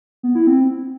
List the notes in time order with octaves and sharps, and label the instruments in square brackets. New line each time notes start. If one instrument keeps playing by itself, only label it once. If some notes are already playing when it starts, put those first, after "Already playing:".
[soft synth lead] B3
E4
C4